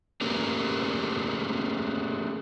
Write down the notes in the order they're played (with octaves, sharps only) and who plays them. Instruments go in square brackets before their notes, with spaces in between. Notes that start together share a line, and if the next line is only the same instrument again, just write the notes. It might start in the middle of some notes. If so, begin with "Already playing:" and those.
[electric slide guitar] A3 A#3 C#4 G4 G#4 A#4